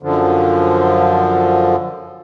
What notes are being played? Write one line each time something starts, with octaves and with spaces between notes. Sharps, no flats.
F#2 D3 F3